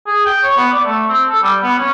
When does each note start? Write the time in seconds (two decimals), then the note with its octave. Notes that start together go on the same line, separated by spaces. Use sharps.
0.07 G#4
0.25 G5
0.43 C#5
0.57 B3
0.73 D5
0.84 A3
1.09 C4
1.28 A4
1.42 G3
1.63 B3
1.78 C#4